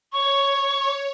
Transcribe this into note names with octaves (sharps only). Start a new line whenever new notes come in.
C#5 C#6